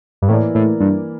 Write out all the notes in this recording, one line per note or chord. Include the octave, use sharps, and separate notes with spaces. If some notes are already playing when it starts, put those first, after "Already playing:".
G2
A2 E3 A#3 E4 A#4 D5
A2
G2